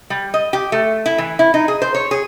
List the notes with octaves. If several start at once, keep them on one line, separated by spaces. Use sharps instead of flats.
G3
D#5
G4
A3
E4
E3
E4
D#4
G#4
C5
C#5
G#4